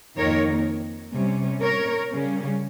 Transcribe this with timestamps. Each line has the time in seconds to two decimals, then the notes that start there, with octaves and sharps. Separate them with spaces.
0.18 F2 D#3 A#3 A#4 C#5
1.14 C3 G3 C#4
1.62 A#4 C#5
2.12 C#3 G3 C#4